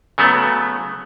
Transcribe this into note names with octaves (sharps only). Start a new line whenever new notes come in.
C#3 F#3 A3 B3